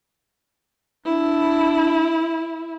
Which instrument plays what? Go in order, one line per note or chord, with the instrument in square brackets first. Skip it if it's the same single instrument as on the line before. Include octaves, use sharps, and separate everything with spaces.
[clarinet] D4 [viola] E4